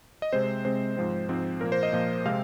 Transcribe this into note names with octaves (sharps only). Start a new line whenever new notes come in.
D#5
C3 G#3 C4 C5
C3 G#3 C4 C5
G#2 F3 C4
G#2 F3 C4
A#2 F3 A#3 A#4
C5
D#5
A#2 F3 A#3
C3 G#3 C4 F5